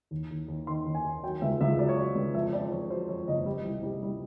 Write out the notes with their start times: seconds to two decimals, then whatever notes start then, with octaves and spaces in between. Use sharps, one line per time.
0.11 D#2
0.31 D#2
0.48 D#2
0.67 D#3 C6
0.86 D#2
0.95 G#5
1.05 D#2
1.23 F#3 G5
1.42 C#2 E5
1.61 C#2 E5
1.78 F#3 D5
1.89 C#5
1.97 F#3 D5
2.15 C#2
2.34 F2 E5
2.53 F2 D5
2.71 F2 C#5
2.90 F#3 C5
3.09 F2 C#5
3.28 F#1 D#5
3.46 G3
3.65 C2
3.83 G3
4.03 G3